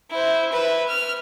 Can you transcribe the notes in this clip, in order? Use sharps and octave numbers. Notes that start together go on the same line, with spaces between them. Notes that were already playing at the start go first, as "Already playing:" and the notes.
E4 C5
B4 E5
F6